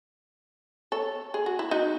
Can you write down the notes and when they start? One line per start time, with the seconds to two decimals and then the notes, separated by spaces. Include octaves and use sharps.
0.92 A4 C#5
1.34 G#4
1.46 F#4
1.59 E4
1.71 D#4 F#4